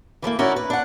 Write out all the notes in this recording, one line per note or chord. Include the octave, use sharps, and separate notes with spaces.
E3 F3 A3 A#3
D#3 C#4 E4 F#4 A#4 D5
B4
D4 F#5